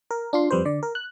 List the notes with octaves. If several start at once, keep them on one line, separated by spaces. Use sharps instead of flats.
A#4
D4 F4 C6
F2 G3 B4 C5
D3 D5
A#4
F#6